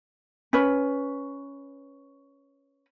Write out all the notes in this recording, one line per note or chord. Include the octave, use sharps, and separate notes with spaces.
C#4 B4